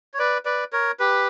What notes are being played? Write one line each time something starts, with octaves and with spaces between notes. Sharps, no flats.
C#5
B4 D5
B4 D5
A#4 C#5
G4 B4